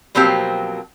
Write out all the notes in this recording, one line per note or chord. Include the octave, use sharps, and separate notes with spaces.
B2 F3 F#3 A#3 C4 G4